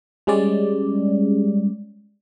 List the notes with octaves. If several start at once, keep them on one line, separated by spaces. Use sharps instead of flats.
G3 G#3 C#4 D5